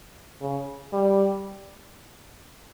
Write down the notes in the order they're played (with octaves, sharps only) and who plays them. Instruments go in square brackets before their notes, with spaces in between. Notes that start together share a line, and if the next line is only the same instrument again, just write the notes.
[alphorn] C#3
G3